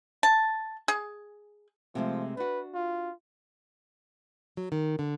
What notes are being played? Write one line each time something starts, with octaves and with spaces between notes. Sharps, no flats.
A5
G#4
C3 F3 G#3 A3
D4 F#4 B4
F4
F#3
D#3
D3